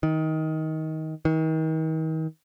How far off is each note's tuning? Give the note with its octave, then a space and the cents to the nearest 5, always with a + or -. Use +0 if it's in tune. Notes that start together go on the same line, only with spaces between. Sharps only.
D#3 +20
D#3 +40